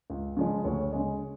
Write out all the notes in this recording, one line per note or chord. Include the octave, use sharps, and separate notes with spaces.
C#2
C#3 F3 G#3
D2 C#5
C#3 G#3